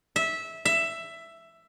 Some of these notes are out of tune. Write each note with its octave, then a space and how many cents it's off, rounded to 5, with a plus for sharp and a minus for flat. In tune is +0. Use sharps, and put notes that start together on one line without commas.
E5 -15
E5 +10